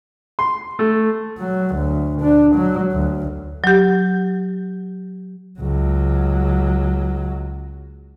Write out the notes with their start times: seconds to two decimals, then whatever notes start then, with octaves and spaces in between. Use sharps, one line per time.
0.39 C6
0.79 A3
1.39 F#3
1.75 D2
2.21 D4
2.56 F#3
2.92 D2
3.64 F#3 G4
5.59 C#2 F#3